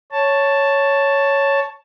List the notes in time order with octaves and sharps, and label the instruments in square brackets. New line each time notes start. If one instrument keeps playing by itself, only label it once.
[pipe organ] C#5 A5